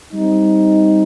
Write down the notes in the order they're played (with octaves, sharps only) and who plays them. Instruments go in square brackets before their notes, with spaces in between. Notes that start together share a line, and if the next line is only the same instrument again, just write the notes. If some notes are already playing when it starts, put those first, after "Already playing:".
[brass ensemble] G3 C4 D#4